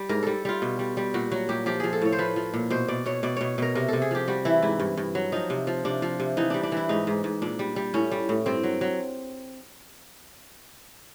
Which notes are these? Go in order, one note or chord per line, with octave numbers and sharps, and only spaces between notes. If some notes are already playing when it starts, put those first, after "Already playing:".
Already playing: G3
G#2 A#4
G3 A4
G3 F4
B2
G3
G3
A#2 F#4
F#3 F#4
A#2 G4
F3 G4
F3 G#4
A4
A2 C#5
C5
F3 B4
F3
A#2
B2 C5
B2 D5
B2 C#5
B2 D5
B2 C#5
B2 A#4
C3 A#4
C3 A4
G#4
F3 G4
G3 F#4
E3 E4
G#2 E4
G2
G2
F#3
F3 D#4
C3
F3
C3 D4
F3
C3
E3 D#4
G3 D4
D4
E3 E4
G#2 D#4
G#2
G#2
A#2 D4
G3
G3
A2 C#4
G3
A2
G2 C4
F#3
F#3